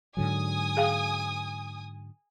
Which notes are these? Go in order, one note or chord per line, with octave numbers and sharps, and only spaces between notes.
G#2 D3 F#3 G#5 D#6
G#4 F5 G5